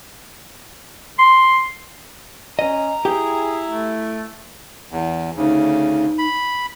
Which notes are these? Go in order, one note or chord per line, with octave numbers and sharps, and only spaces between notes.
C6
C#4 D#5 A#5
E4 G4 G#4 G5
A3
E2
D2 C#3 D#4
B5